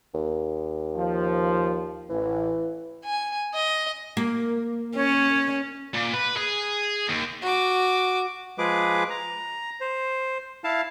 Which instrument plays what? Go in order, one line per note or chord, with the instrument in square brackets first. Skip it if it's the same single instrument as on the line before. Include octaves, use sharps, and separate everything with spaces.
[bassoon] D#2
[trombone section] F3
[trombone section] A1 [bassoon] E3
[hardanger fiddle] G#5
D#5
[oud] A#3
[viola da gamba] C#4 [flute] C#5
[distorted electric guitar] A#2
B4
G#4
D#2
[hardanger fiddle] F#4 D6
[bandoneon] F3 G#3 G#4 B4 D6
A#5
C5
E4 F5 A5